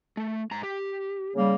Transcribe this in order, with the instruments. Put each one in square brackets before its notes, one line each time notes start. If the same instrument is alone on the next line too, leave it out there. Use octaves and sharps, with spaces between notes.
[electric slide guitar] A3
G#2 A#5
G4
[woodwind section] C#3 G3 A#3